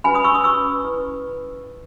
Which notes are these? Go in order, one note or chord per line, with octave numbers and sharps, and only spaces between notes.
C#4 F#4 B4 G#5 B5
B5 D#6
C#6 E6
B5 D#6
C#4 F#4 B4 C#6 E6
E4 B4